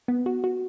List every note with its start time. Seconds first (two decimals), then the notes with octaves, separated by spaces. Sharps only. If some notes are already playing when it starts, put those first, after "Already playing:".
0.08 B3
0.26 F#4
0.44 F#4